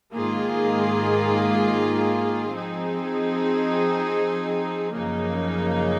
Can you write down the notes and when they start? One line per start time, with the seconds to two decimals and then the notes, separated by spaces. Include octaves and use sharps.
0.15 G#2 D#3 A#3 F4 G#4
2.54 F3 C4 D#4 G#4
4.93 F#2 C#3 F3 A#3 D#4